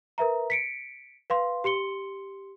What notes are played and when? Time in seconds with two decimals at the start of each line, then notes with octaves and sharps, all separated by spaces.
0.18 A#4 B4 E5 A#5
0.50 B6 C#7 D7
1.30 B4 F5 C6
1.64 G4 C6 C#7 G7